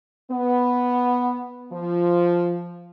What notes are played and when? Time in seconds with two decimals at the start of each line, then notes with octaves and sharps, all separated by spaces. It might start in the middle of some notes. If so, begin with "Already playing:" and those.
0.31 B3
1.72 F3